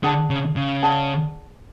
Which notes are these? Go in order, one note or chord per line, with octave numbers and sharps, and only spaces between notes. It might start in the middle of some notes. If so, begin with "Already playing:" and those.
D3 G#4 D5 F#5 A5
C#3
C#3
G#4 D5 F#5 A5